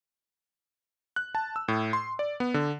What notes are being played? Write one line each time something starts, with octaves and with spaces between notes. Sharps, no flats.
F#6
A5
E6
A2
C6
D5
B3
D3